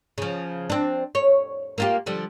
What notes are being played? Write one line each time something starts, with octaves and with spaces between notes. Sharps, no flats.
C#3 F3
C4 D4
C#5
A#3 F4 G4
D3 F3 G3